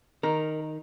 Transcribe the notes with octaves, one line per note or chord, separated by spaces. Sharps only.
D#3 A#4